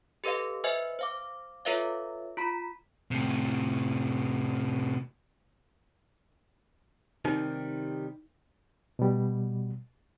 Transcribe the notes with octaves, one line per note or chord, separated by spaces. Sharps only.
G4 A4 B4 D#5 F5
B4 C5 D#5 E5 G#5
C5 F5 D6
F4 A4 B4 C#5 E5 F5
F4 A#5 B5 B6
A2 C3
C3 D#3 G3 D#4
B2 G3